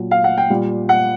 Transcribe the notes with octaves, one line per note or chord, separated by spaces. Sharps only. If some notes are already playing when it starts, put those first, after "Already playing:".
Already playing: A#2 F#3
F5
F#5
G5
A#2 G3
F#5